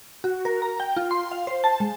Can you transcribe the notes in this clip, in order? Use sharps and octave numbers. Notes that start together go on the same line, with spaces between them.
F#4
A#4
A#5
G5
F4
C6
F5
C5
A5
G#3